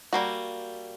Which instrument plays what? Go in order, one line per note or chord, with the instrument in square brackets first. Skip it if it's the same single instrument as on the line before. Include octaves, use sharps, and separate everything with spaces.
[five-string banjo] G3 A#3 F#4